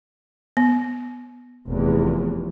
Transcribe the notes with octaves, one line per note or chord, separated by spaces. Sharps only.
B3
F1 E2